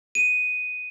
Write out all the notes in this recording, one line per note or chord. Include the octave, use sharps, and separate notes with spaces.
D#7